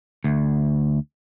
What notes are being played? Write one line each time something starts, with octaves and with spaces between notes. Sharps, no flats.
D2